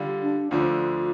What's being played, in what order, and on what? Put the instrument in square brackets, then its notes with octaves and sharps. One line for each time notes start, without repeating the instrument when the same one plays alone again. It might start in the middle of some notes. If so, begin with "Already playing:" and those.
Already playing: [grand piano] D3 G3 F4 D5
[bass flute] D4
[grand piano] D2 D3 F3 D4 [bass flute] F4